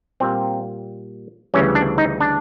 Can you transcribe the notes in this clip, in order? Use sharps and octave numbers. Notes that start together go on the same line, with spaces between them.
A#2 G3 A#3 C4
D2 C#3 E3 G3 C#4
D4
D#4
D4